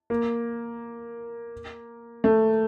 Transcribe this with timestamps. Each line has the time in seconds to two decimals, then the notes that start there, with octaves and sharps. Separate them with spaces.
0.10 A#3
2.24 A3